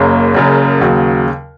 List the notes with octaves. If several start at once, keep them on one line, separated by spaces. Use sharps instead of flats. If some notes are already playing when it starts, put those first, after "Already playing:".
Already playing: F#1 F#2 C#3 A#3 C#4
F#1 F#2 C#3
D#2 C#3 F#3